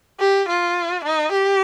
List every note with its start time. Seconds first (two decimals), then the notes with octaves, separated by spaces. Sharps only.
0.20 G4
0.48 F4
1.05 D#4
1.32 G4